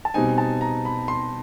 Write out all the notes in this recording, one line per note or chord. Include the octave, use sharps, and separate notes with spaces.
A5
B2 G3 C4 D#4 G#5
A5
A#5
B5
C6